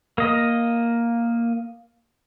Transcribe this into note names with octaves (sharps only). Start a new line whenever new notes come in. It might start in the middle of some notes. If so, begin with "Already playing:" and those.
A#3 D#5